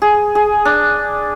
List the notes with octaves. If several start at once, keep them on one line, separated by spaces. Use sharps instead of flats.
G#4
G#4
D4